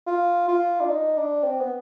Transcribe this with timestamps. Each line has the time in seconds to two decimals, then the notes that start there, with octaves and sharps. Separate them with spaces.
0.07 F4
0.48 F4
0.81 D4
0.89 D#4
1.17 D4
1.44 C4
1.60 B3